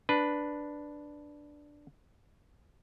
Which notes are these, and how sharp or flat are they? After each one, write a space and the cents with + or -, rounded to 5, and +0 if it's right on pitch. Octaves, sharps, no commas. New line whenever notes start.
D4 +0 B4 +0